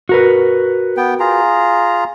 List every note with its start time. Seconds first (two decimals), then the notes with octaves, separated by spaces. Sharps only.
0.09 F#4 A#4 B4
0.97 B3 G5
1.20 F4 G#4 A#5